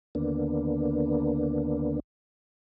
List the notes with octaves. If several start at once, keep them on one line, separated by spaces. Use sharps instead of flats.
D#2 D3 A#3 B3 D4